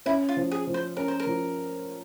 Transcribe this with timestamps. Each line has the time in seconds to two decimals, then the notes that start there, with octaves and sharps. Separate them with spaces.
0.06 C#4 E4
0.29 F4
0.37 F3
0.51 G#4
0.67 F3
0.74 C5
0.97 C#4 A#4
1.08 C5
1.20 A#4
1.26 F3